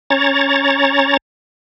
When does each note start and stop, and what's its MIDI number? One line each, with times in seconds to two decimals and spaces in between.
0.10 1.17 61
0.10 1.17 73
0.10 1.17 82
0.10 1.17 93